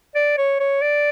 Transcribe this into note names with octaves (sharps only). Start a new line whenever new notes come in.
D5
C#5
C#5
D5